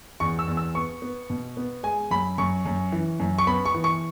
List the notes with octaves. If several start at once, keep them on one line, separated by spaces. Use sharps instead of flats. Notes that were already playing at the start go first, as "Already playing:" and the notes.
E2 C#6
E6
E2
E6
B3 C#6
B3
B2
B3
G#3 G#5
F#2 B5
F#2 C#6
F#2
E3
F#2
C#6
B3 B5
C#6
E3
C#6